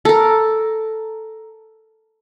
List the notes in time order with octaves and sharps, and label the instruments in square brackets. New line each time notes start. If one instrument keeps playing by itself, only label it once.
[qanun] A4 A#4